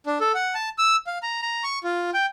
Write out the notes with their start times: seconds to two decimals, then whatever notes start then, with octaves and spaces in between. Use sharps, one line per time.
0.06 D4
0.21 A4
0.34 F#5
0.55 A5
0.78 E6
1.07 F5
1.23 A#5
1.42 A#5
1.64 C#6
1.84 F4
2.14 G5